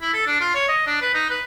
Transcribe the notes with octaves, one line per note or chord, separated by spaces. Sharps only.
E4
A4
D4
F4
C#5
D#5
D4
B4
D#4
B4